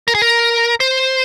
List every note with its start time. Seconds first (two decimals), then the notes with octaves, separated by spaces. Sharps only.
0.08 A#4
0.15 G#4
0.22 A#4
0.80 C5